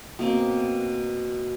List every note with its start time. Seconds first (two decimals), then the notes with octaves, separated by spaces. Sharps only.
0.19 B2 A#3 C4